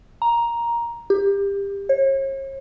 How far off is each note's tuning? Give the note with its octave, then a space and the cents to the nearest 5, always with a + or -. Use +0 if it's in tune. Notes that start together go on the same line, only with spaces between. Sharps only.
A#5 +10
G4 +25
C#5 -40